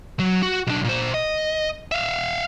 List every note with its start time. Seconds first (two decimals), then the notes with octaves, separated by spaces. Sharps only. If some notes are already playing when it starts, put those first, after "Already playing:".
0.19 F#3
0.43 F#4
0.67 B1 D4
0.84 A#2 C5
1.14 D#5
1.92 E5 F5